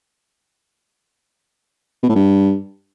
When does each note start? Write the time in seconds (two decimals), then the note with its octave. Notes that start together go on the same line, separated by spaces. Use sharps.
2.03 B2
2.09 A2
2.16 G2